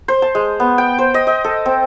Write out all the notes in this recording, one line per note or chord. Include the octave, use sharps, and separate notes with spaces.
C5
A5
G#3
B3
G5
C5
D#5
D#5
A4
C4